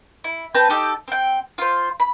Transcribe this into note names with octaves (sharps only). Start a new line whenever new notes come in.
E4
C4 B4 A5 G6
D#4 G4 A4
C4 G5
F4 C5
B5